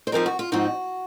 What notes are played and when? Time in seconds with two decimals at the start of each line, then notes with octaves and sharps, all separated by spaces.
0.07 C5
0.12 G#2 F3 C4 D#4 A#4
0.26 F#4
0.39 F4
0.52 G#2 F3 C4 D#4 F#4